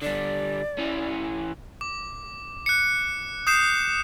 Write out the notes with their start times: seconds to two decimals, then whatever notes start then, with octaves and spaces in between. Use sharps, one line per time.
0.02 D3 G3 D5
0.78 E3 C#4
1.81 D6
2.66 F#6 C#7
3.47 D#6 G6 C7 E7